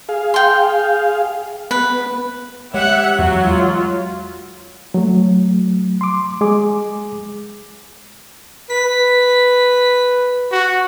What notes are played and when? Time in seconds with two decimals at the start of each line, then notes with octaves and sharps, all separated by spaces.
0.09 G#4 F5
0.34 G5 C6
1.71 B3 B4
2.74 G#3 G4 C#5 E5 F#5
3.19 E2 F#3 F#4
3.47 G#3 F4
4.94 F#3 A3
6.01 C6 D6
6.41 G#3 G#4 D6
8.70 B4 B6
10.52 F#4